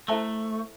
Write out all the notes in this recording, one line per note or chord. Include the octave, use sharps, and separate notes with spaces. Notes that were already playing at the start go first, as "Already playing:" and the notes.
A3 E4 A4 C5 E5 A5